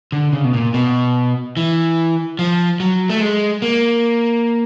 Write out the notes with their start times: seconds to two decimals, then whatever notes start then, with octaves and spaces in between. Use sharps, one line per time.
0.12 D3
0.33 C#3
0.44 B2
0.54 A#2
0.74 B2
1.57 E3
2.39 F3
2.80 F#3
3.09 A3
3.21 G#3
3.62 A#3